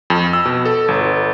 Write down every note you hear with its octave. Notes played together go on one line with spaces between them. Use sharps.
F2
E6
B2
A4
G1